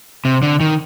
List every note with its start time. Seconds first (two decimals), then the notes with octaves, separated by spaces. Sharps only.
0.25 C3
0.43 D3
0.60 D#3